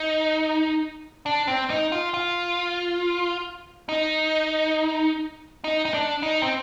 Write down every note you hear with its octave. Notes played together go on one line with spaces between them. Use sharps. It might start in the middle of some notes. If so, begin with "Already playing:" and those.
Already playing: D#4
D4
C4
D#4
F4
F4
D#4
D#4
D#4
D4
D#4
C4